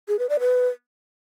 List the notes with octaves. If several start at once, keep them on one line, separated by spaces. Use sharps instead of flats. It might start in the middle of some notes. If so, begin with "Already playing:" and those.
G#4
B4
D5
B4